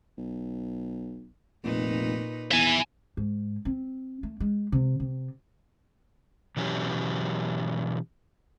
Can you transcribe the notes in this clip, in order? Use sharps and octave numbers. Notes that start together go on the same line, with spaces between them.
B1
F1 A#2 D#4 B4
E2 E5 G#5
G#2
C4
A3
G#3
C3
C3
B2 E3 F#3 C#4 G4